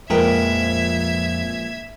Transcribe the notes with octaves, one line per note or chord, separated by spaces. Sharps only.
A#1 F2 G#3 A#4 B4 E5 G5 G#6